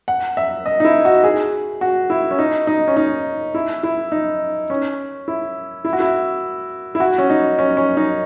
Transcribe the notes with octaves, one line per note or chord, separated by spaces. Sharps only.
F#5
E5
D#5
D#4
E4
F#4
G#4
F#4
E4
C#4
D#4
D#4
C#4
D#4
E4
E4
D#4
C#4
E4
E4
F#4
E4
E4
F#4
C#4
D#4
C#4
C#4
D#4